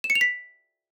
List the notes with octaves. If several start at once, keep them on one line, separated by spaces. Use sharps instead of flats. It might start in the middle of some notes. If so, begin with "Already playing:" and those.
E7
C#7
F7
B6